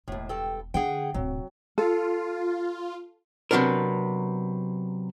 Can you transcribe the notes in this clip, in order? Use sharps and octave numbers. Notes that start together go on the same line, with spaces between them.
E1 D#2 A2
G2 A4 G5
D3 G#4 F#5 G5
D1 C3 F#3
F4 A4
C3 F#3 B3 D4 A#4